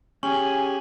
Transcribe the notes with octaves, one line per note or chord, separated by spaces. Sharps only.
C#4 G4 G#4 G#5 C#6 F#7